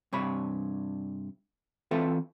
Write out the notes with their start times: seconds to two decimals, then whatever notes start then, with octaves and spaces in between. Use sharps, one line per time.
0.13 G2 C3 C#5 B5
1.91 E3 C4 F4 A4 B4 E5